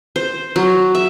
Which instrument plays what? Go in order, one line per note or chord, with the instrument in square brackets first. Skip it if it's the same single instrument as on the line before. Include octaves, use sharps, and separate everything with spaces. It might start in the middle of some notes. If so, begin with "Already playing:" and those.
[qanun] C5
F#3
E5